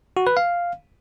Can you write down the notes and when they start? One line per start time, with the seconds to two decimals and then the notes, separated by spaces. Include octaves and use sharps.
0.17 F#4
0.27 B4
0.37 F5